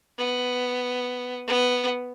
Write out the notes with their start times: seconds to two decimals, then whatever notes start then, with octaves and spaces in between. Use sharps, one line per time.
0.18 B3
1.47 B3